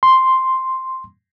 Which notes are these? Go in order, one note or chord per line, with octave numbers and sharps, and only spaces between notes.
C6